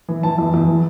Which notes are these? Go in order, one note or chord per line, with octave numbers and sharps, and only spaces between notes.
E3
E3 A5
E2
E2
E3